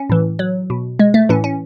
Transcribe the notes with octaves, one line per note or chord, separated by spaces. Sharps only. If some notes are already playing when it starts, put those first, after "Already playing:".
Already playing: C#4
A2 E3
F#3
B2
G#3
A3
A2 E3 C#4
C#4